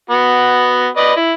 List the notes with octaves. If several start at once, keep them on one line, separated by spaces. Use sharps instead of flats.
B3 F#4
B4 D5 D#5
E4